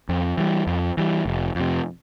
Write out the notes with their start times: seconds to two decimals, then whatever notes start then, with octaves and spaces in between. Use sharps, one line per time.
0.09 F2
0.37 E3 G3
0.67 F2
0.97 E3 G3
1.26 F1
1.55 F2 C3